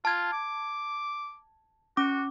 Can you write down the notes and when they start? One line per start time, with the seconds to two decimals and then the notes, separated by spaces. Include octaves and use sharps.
0.05 F4 A5 G#6
0.33 D6
1.97 C#4 F#4 D6